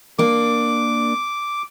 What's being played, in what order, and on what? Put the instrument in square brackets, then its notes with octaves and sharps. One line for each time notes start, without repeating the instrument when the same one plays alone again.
[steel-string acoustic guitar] A#3 D4 [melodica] D6